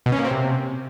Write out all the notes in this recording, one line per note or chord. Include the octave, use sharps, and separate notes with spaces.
B2
C#4
A#3
C4
C3